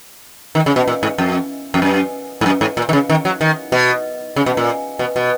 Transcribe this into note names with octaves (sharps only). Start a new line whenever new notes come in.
D#3
C#3
B2
A#2
G#2
F2
F2
F#2
G#2
F#2
G#2
A#2
D#3
C#3
D#3
F#3
D#3
B2
C#3
B2
A#2
B2
B2